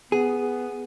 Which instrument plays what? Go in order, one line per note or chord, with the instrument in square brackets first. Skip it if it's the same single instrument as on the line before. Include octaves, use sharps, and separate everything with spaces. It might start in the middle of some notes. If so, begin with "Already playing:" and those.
[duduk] B3 [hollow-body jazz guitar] G#4